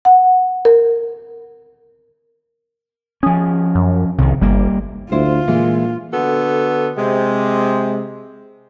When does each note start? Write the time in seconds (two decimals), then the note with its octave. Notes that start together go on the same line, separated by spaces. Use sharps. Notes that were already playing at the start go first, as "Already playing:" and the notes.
0.05 F#5
0.65 A#4
3.23 F3 C#4 G#4
3.75 F#2
4.18 C2 C3 D#3
4.42 G1 G3 A#3
5.12 D2 E4 F4 C5
5.48 A#2 E3 G#3
6.13 D3 B3 F#4 A4
6.97 C3 G#3